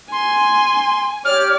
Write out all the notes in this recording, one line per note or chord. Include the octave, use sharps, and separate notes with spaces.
G#5 C6
G4 C#5 D5 F6